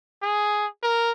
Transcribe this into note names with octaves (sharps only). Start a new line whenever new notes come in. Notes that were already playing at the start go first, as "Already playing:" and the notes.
G#4
A#4